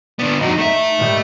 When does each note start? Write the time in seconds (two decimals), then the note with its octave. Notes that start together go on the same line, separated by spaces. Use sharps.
0.19 D3 B3 D5
0.41 F2 D#4 F#4
0.58 A3 E5
0.99 G#2 D#3 G3